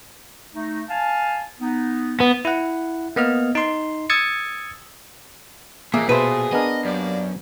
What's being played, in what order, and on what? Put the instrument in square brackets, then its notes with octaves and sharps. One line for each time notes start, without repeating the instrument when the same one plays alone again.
[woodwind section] A3 D#4
F5 G#5 A5
B3 D#4
[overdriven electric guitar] B3
[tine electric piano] E4 F#5
A#3 B3 D#5 F6
D#4 C6
D#6 E6 G#6 A6 C#7
[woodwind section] F2 E3 [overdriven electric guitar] A#2 [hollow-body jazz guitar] A#3 [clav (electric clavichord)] G#4 A#4 E5
[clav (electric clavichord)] B2 A4 E5 [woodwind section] G#4 [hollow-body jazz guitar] B4 C5
[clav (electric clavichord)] B3 D4 A#4 [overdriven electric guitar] D#5
[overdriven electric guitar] F#2 [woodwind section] G3 A#3 D5